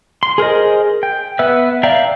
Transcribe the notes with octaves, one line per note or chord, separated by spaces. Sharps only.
C6
G#4 A#4 C5 D#5
G5
B3 B4 E5 E6
D5 E5 F5 G5 A#5